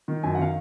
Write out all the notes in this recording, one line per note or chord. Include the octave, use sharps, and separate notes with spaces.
D#3
F#2 G#5
F#5
D#3 F5